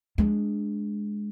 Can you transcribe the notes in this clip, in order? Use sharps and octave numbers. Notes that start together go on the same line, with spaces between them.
G#3 D4